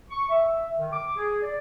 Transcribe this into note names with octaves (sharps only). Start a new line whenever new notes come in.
C#6
E5
D#3
D6
G#4
D5